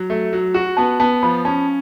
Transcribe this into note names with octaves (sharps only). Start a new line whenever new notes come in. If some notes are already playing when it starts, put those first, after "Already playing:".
Already playing: F#3
A3
F#3
F#4
B3 A5
B3 A5
F3 B5
C#4 A5